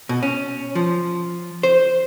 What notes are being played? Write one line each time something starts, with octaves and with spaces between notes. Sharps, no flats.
B2
C#4
F3
C5